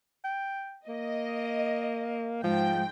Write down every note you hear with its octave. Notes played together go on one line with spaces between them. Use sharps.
G5
A#3 D#5
G#2 F3 G5